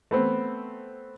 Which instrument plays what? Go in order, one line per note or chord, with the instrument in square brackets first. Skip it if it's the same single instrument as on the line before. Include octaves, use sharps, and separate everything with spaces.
[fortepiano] A3 B3 C4